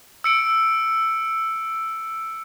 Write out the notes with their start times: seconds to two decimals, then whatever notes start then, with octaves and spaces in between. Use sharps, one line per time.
0.24 E6 C#7 D7